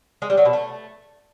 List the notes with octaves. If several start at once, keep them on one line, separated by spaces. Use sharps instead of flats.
G#3
G3
F#3
B2
A3